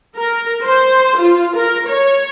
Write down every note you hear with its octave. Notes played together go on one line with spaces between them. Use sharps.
A#4
C5
F4
A#4
C#5